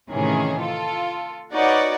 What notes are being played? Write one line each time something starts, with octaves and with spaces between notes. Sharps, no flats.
A2 C3 D#3 E3 C#4 G#4
F4 A4
D#4 F#4 B4 C#5 D5 F#5